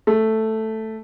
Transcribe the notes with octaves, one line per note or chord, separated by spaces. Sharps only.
A3